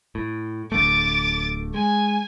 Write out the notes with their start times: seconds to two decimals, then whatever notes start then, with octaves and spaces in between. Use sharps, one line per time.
0.15 A2
0.72 D1 D3 A3 D6 A6
1.74 G#3 G#5